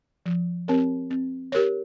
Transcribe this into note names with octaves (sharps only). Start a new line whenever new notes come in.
F3
C4 G4 A#4 C#5
C4
G4 A#4 C#5